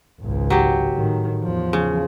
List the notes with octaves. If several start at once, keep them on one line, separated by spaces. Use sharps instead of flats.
G#1 C#2
F#3 G4
A2 D#3
E2 F3
C#3